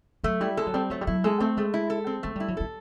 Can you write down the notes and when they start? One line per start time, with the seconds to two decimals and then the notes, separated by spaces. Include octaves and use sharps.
0.24 F#3 A3
0.41 G3 E4
0.57 G#3 A4
0.67 F#3
0.74 G3 C4
0.90 F#3 A3
1.01 G3
1.07 F#3 E4
1.24 G#3 A4
1.40 A3 C4
1.57 G#3 A3
1.74 E4
1.90 A4
2.07 C4
2.23 G#3 A3
2.36 G3 E4
2.48 F#3
2.57 G3 A4